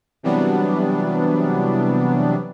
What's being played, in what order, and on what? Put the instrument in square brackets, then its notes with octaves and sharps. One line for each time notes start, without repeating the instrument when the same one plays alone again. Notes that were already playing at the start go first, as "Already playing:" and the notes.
[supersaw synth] C3 E3 F#3 G3 B3 D4